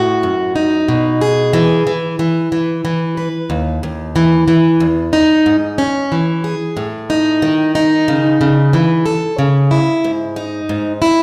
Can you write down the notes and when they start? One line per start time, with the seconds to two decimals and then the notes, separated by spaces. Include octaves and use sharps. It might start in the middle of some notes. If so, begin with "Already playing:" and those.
Already playing: A2 F#4
0.23 F#2
0.56 D#4
0.88 B2
1.21 G#4
1.53 E3
1.87 E3
2.19 E3
2.52 E3
2.85 E3
3.17 B4
3.50 D#2
3.83 D#2
4.16 E3
4.48 E3
4.80 E2
5.13 D#4
5.46 G#2
5.78 C#4
6.12 E3
6.44 G#4
6.77 A2
7.10 D#4
7.42 D#3
7.75 D#4
8.08 C#3
8.41 C#3
8.73 E3
9.06 A4
9.39 C#3
9.71 E4
10.04 G#2
10.36 D#4
10.69 G#2
11.02 E4